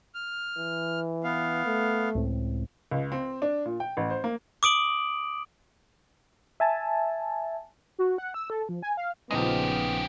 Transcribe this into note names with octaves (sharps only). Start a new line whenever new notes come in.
F6
E3
B3 F5
A3
C#2 A2 C4
C#2
C4
D4
A#2
G5
A1
C5
A#3
D6 D#6 D7 F#7
E5 G#5 A5
F#4
F#5
E6
A4
F3
G#5
F5
A#1 C#3 F3 G#3 B3 D#4 G4 D#6